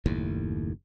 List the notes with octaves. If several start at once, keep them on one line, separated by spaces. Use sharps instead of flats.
F#1 D#2 A2